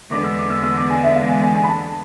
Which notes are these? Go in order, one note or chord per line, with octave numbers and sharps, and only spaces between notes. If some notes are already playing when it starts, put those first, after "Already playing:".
E2 D3 G#3 B3 D6
E6
D6
E6
E6
D6
G#5
E5
F5
G#5
G#5
G#5
B5
A5